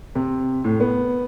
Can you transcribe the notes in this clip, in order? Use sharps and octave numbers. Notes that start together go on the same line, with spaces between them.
C3
A2
B3